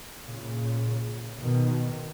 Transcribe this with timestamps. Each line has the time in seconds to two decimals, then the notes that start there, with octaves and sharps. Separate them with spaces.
0.24 A#2 C#3
1.40 B2 D#3